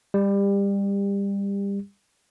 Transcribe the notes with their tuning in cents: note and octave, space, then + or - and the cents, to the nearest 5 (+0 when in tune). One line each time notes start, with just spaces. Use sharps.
G3 +25 G4 +30